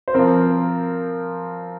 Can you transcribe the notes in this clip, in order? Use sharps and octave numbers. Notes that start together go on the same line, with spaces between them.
C5
F3 C4 A#4